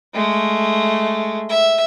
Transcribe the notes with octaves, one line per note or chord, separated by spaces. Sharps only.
G#3 A3
E5